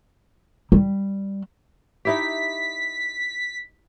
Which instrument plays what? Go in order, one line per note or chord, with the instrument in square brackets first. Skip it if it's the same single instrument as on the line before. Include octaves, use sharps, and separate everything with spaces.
[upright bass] G3
[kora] D#4 E4 G4 [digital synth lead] B6